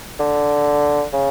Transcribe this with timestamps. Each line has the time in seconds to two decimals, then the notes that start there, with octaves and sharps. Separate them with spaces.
0.19 D3
1.13 C#3